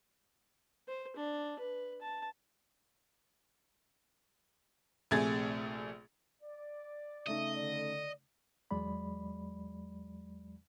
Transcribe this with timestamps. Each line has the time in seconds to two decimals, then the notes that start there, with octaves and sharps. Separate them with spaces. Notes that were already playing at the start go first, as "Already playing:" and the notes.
0.88 C5
1.17 D4
1.59 B4
2.02 A5
5.11 A#1 C3 A3 G#4 G#6 A6
6.41 D5
7.27 C#3 A3 D#4 D#5 E5
7.56 D3 D5
8.71 E2 F#3 G#3 D5 B5